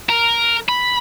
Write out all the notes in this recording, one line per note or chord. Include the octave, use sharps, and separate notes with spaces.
A#4
B5